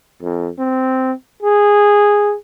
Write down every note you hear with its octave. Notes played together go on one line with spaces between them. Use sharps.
F2
C4
G#4